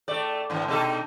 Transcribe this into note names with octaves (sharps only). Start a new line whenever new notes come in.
A2 A3 D5
G#2 D3 E3
B2 D#4 A4